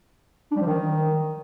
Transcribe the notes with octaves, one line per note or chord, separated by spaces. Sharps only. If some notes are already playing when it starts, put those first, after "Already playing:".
D4
G3
F3
D#3